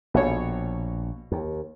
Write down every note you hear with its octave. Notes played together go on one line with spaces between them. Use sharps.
A#1 B2 A4 C#5
D#2